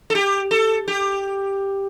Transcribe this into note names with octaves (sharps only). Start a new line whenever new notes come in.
A4
G4
A4
G4